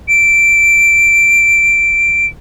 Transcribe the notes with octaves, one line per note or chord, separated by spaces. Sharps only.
D7